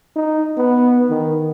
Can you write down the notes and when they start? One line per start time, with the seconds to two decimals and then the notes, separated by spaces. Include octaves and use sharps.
0.16 D#4
0.57 B3
1.10 D#3